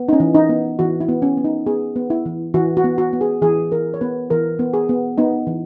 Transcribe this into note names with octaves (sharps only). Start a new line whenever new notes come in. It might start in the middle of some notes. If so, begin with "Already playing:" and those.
Already playing: B3
D#4
C#4
E3
D#4
B3
E3 F#4
E4
B3
C#4
B3
D#4
B3 G#4
B3
E4
E3
E3 F#4
F#4
B3
F#4
B3
G#4
E3 G#4
E3 A#4
C#5
B3 B4
E3 A#4
B3
G#4
B3
B3 D#4
E3